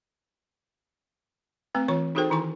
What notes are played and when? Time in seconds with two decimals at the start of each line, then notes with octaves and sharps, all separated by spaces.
1.74 A3 C4 B4 A#5
1.88 E3 F4 C#5 C#6
2.15 D#4 F#4 G#4 A4 C5 G5
2.30 D#3 E3 E4 G#5 A#5 C#6